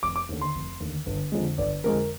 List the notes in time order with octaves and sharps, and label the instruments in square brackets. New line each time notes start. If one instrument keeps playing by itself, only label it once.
[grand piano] F1 D6
D6
D#2 D3
C6
F1
D#2 D3
G1
F2 D3 F3 G#3
G1 D5
F2 D3 F3 G#3 A#4